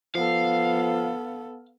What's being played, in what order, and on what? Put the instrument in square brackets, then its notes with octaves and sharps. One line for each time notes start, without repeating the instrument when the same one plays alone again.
[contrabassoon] F3 [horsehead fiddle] B3 A4 [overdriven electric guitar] F5